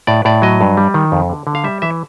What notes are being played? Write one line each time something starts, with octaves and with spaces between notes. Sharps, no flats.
A2 D5
A2 D5
F#3 D#5
G2
G3
D#3
F2
D3
D3
F5
G3 E5
E3 E5